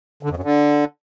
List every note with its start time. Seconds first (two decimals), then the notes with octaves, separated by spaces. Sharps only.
0.23 D3
0.30 F2
0.37 F#2
0.43 D3